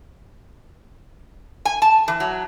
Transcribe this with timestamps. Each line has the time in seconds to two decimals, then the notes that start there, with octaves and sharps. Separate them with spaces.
1.65 G#5
1.82 A5
2.08 E3
2.20 F#3